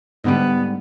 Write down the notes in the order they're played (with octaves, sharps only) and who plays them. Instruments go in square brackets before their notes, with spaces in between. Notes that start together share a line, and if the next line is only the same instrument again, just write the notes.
[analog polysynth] G#2 D3 G3 [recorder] B3